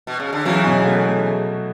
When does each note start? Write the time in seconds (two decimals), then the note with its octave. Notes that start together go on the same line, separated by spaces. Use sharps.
0.07 B2
0.20 C#3
0.33 D3
0.45 C#3 E3 F#3
0.65 B2
0.85 A3
1.06 A3